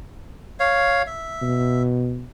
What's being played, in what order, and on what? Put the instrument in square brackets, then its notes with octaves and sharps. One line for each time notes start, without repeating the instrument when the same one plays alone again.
[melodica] C#5 F5
E5
[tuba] B2